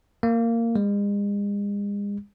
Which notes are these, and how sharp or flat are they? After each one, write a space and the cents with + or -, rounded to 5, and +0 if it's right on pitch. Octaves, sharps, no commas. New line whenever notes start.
A#3 -15
G#3 -40